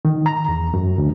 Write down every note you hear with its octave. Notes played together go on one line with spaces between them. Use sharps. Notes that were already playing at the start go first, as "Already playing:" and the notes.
D#3
A#5
E2
F#2
D2